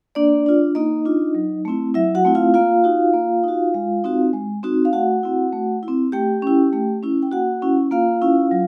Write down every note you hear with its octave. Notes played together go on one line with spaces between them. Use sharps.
A#3 D4 D5
D4 F4
A#3 D#4 D#5
D4 F4
F#3
A3 C4 E4
F#3 E4 E5
F#4 F#5
A3 C4 E4
F4 F5
A#3 F4 F5
D#4 F#4
A#3
D#4 F#4
G#3
C4 D#4 F#4
G#3
C4 D#4 F#4
F5
A3 F#4 F#5
C4 E4
A3
E4
C4
A3 G4 G5
C#4 E4
A3
C#4 E4
G5
A#3 F#4 F#5
C#4 E4
A#3 F4 F5
C#4 E4
F#3